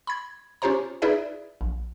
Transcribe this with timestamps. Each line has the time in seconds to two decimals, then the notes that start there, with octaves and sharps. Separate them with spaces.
0.07 B5 G#6
0.62 C#4 F4 G4 C5 C#5 A#5
1.02 D#4 E4 G#4 B4 D5 E5
1.61 A#1